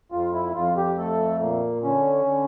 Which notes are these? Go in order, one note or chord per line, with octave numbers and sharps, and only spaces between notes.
F2 F4
E4
F2 F4
G4
A3 A4
A#2 A#3
D3 C#4
D3